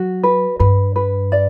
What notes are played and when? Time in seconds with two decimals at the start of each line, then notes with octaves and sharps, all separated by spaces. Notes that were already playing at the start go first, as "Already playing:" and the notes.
Already playing: F#3 F#4
0.24 B4
0.60 G2 B4
0.96 B4
1.32 D5